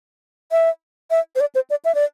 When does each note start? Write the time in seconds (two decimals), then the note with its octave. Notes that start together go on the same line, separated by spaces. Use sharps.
0.52 E5
1.11 E5
1.36 C5
1.40 D5
1.55 C5
1.70 D5
1.85 E5
1.95 D5